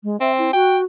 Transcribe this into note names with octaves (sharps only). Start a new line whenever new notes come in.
G#3
C4 E5
E4
F#4 G5